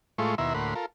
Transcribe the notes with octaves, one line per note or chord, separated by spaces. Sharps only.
A2 G#3 A3 F4 C6 C#6
D#2 B2 E4 E5 A#5 C6
D2 A2 A#3 F#5 B5 C6
F4 A4 A#4